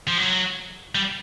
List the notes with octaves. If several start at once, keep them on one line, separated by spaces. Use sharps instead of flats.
F3
F#3
G3